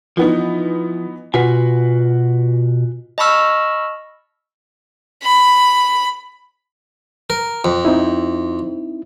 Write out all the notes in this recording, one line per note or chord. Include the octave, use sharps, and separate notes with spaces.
E3 F3 B3 D#4
B2 F4 F#4 B4 G#5
D#5 A5 B5 C#6 E6 F6
B5
A#4
F2
C4 D#4 E4